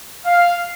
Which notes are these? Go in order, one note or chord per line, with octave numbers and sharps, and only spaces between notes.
F5